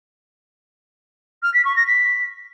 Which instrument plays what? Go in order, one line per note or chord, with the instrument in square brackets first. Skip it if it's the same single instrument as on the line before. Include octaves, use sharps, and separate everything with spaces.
[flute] F6
B6
C#6
A#6
B6